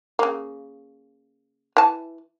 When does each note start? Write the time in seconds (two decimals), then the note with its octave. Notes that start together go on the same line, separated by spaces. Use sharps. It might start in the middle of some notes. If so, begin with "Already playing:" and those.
0.19 C#3 A#3
1.77 E3 A5